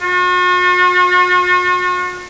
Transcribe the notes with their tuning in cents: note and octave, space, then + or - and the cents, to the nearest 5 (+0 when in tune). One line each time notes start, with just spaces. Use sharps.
F#4 -45